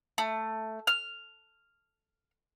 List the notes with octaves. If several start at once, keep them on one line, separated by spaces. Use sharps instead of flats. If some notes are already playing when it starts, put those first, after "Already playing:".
A3
F6